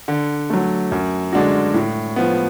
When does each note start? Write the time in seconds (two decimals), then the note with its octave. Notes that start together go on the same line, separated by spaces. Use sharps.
0.08 D3
0.50 F#3 A3
0.92 F#2
1.33 D3 G#3 D4 F#4
1.74 A2
2.16 F3 B3